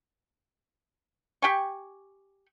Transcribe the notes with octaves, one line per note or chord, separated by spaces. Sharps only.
G4 G5 G#5 C#6